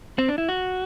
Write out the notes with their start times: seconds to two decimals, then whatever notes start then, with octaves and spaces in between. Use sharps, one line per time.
0.19 C4
0.29 D4
0.38 E4
0.49 F#4